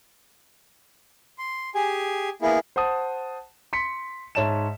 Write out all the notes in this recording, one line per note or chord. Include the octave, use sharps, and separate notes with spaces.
C6
G4 G#4 G#5
A#3 B3 E4 G#4
C5 F#5 A5 D#6
C6 B6 C#7
G#2 C#5 E5 A5 E7